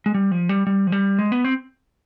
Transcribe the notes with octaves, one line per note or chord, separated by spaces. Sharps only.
G#3
G3
F3
G3
G3
F3
G3
G#3
B3
C4